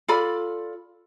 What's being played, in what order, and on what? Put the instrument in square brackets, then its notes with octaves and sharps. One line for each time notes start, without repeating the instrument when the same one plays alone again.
[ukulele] F4 A4 D5 B5